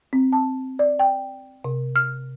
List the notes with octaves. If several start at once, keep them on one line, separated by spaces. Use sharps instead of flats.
C4
A5
D5
G5
C3
F6